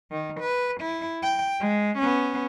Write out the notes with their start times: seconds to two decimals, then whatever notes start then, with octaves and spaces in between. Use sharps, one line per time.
0.11 D#3
0.41 B4
0.81 E4
1.23 G5
1.60 G#3
1.98 B3 C#4